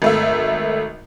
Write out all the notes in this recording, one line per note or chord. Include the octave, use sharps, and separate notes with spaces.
G#1 A3 E5